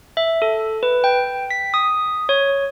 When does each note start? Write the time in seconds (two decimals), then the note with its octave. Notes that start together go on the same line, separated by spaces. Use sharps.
0.17 E5
0.42 A4
0.83 B4
1.04 G5
1.51 B6
1.74 D#6
2.29 C#5